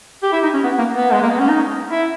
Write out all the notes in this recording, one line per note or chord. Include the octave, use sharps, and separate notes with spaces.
G4
E4
D#4
C#4
B3
A#3
B3
G#3
A#3
B3
C#4
D#4
E4